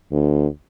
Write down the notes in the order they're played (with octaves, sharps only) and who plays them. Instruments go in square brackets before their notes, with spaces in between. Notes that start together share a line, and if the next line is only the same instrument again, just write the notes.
[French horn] D2